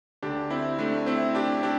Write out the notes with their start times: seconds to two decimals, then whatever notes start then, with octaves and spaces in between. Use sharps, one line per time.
0.22 D2 D3 D4 G4
0.50 C4 E4
0.79 A3 D4
1.06 C4 E4
1.35 D4 G4
1.63 D4 G4